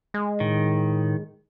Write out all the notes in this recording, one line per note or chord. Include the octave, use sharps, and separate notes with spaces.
G#3
A2 D#3